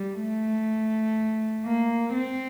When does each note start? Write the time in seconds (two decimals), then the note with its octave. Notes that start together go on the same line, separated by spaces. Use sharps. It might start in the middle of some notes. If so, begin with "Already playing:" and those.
Already playing: G3
0.22 A3
1.65 A#3
2.13 C4